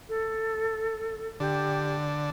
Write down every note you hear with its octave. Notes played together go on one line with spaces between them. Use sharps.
A4
D3 G4